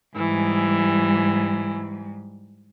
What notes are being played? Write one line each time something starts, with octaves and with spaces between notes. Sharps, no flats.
G#2 E3 G3